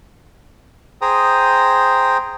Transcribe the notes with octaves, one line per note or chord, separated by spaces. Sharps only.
G#4 C5 G5 A#5 D#6